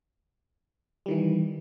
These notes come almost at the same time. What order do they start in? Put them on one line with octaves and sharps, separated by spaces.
G3 D#3 E3